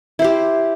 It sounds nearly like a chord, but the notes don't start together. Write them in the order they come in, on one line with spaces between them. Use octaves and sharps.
E4 C5 G4